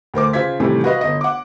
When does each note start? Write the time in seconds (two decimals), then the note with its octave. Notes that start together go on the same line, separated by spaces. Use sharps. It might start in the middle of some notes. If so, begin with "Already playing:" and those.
0.14 D2 A#4 C5 D6
0.33 C#3 F4 C5 G#6 B6
0.60 A2 C3 D#3 E3 G3 A3
0.84 F#4 B4 D#5 F5
1.01 G1 D#5
1.21 F#5 D6